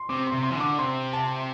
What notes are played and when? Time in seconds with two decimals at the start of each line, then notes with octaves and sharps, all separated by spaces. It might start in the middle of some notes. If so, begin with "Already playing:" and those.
Already playing: C6
0.09 C3 D6
0.27 C6
0.32 C3
0.43 C6
0.51 E3
0.56 D3 D6
0.78 C3 C6
1.13 A5